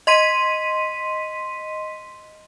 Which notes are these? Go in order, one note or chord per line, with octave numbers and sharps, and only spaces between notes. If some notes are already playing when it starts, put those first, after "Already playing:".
D#5 C6 B6 D#7